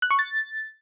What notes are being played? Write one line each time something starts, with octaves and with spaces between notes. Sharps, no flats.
F#6
C#6
A6